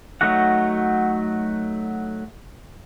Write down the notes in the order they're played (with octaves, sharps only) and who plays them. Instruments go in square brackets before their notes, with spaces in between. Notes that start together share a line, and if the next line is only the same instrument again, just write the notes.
[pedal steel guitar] F#3 A3 D#4 F#4 F#5